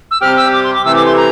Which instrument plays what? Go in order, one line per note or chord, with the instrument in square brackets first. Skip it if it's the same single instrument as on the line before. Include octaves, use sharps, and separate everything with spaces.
[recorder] E6
[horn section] C3 G3 C4 G4 [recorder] F6
[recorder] E6
D6
C6
D6
[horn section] C3 E3 A3 [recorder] E6
[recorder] D6
C6
A#5